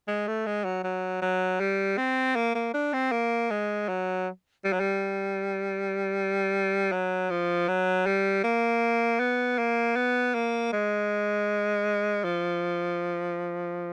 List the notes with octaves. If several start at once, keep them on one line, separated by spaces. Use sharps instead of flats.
G#3
A3
G#3
F#3
F#3
F#3
G3
C4
A#3
A#3
D4
C4
A#3
G#3
F#3
G3
F#3
G3
F#3
F3
F#3
G3
A#3
B3
A#3
B3
A#3
G#3
F3